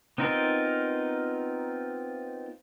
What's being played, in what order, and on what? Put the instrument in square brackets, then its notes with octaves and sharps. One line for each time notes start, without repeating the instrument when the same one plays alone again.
[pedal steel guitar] B3 C4 D#4 F4 A#4